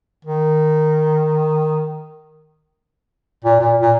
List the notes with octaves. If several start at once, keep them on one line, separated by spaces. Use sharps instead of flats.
D#3
A#2
A#2
A#2